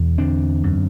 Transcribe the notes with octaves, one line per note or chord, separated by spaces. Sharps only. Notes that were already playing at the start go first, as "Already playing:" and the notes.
Already playing: E2 B2
D3 C4 D4
F#2